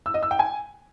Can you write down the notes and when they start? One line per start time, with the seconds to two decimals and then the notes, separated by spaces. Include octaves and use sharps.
0.06 E6
0.14 D#5
0.23 E6
0.31 G5
0.39 G#5